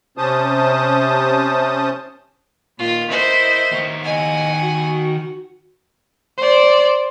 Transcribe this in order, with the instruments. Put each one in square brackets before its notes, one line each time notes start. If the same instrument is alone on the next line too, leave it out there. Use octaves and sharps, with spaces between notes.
[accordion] C3 C#4 C5 A5 D#6
[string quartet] A#2 D#3 [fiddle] F4
[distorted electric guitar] E4 [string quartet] A#4 D#5 E5 [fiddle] C5
[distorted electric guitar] D#3 C#5
[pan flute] D#5 [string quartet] F#5 C#6 [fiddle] G#5
[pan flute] F#4
[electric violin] C5 D5